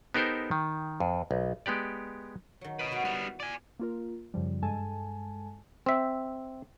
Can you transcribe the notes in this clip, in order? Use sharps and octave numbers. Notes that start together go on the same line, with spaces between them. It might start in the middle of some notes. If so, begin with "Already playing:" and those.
B3 D#4 G4 A4 A#4 C5
D#3
F2
B1
G#3 B3 G4 D5
D#3 F#3
B4 D#5
B3 F#4
G3 B3 E4
D5 G#5
A#3 F4 A#4
F#2 C#3 F3 G3
G2 G#3 A4 G#5 A5
C4 E5